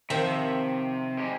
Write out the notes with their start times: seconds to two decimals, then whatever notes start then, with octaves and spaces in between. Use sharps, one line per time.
0.10 C3 D#3 F3 E5
1.18 G#3 G4